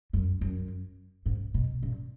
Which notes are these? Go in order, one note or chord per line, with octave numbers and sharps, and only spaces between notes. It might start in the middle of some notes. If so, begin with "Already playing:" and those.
F#2
F#2
G#2
B2
A#2